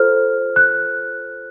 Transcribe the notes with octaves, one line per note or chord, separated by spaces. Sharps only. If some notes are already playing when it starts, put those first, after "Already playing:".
Already playing: F4 A4 C5 F6
F#6